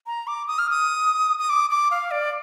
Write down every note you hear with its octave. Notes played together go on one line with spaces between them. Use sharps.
A#5
D6
D#6
F6
D#6
D#6
D6
D6
F5
D5